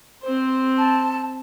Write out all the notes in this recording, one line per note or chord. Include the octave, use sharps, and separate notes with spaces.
C4 C5
A5